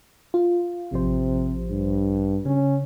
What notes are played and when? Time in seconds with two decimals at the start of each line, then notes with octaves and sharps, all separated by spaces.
0.34 F4
0.92 A1 C3 F3 C5
1.70 G2
2.45 C#3 C#4